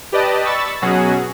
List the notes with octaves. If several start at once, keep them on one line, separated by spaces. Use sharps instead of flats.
G4 B4 D5 D#5 A5
B5 C#6 E6 A6
B2 F#3 C#4 F#4 G#4